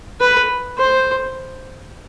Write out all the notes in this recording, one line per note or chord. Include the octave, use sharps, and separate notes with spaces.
B4
C5